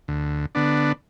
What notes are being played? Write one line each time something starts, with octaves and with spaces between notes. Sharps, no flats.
D2
D3 B3 D4